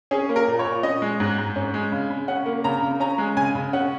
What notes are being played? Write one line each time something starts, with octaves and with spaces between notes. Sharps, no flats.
C#4 G#4
A#3
A#4
A#2
C#5
A#2
C#4 D#5
G#3
G#2
G#2
C#4
G#3
C#3
C#3
C#4 F#5
A#3
C#3 A#5
C#3
C#4 A#5
G#3
C#3 G#5
C#3
C#4 F#5